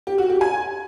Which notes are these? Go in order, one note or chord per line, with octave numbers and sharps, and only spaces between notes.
G4
F#4
G4
G#5